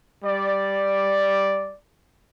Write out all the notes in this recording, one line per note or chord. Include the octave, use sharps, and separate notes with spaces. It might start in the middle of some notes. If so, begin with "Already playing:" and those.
G3 D5